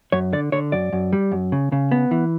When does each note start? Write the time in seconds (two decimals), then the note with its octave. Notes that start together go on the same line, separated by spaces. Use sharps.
0.12 F#2 C#5
0.33 D3 D5
0.52 D3 C#5
0.72 F#2 D5
0.93 F#2
1.13 G3
1.32 F#2
1.52 C#3
1.72 C#3
1.91 B3
2.11 E3